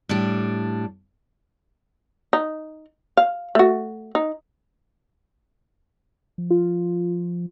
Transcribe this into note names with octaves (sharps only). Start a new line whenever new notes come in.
A2 G3 D4
D#4
F5
A3 F#4
D#4
F3
F4